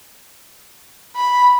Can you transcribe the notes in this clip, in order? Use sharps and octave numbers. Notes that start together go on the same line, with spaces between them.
B5